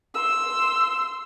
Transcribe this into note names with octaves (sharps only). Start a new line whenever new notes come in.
C6 E6